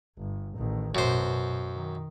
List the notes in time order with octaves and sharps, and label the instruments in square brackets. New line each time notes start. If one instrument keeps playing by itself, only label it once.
[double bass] G1
A1 D#3
[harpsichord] F#2 C5 [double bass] B2
[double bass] D#3